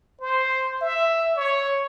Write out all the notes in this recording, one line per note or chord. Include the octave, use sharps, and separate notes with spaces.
C5
E5
C#5